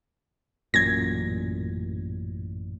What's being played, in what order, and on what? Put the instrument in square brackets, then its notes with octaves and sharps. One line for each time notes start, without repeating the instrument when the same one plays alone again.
[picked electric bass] A1 F#2 A#2 [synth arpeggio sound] G#6 A#6